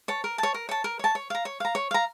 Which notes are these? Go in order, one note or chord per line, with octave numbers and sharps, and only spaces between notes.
C#5 A5
A#4
C#5 A5
A#4
C#5 A5
A#4
C#5 A5
C#5
F5 A#5
C#5
F5 A#5
C#5
F5 A#5